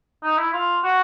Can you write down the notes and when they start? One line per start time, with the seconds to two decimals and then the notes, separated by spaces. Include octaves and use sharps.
0.23 D#4
0.38 E4
0.53 F4
0.84 F#4